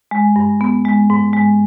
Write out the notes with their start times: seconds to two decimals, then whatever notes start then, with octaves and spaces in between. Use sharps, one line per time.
0.11 G#3
0.36 G2
0.61 B3
0.85 G#3
1.10 G#2
1.33 G#3